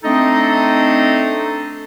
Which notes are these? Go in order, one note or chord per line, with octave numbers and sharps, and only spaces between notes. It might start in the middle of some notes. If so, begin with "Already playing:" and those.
A3 C4 D4 D#4 A4 D#5